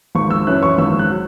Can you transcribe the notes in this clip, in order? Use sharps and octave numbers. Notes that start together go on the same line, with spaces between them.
G#1 C#6
E6
F#2 E3 C#4 E4 F#6
C#6
G#1 E6
F#6
F#3